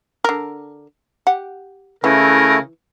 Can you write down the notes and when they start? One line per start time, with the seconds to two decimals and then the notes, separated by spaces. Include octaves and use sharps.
0.24 D3 A#4
1.27 G4 F#5
2.04 C#3 E3 A3 E4 A#4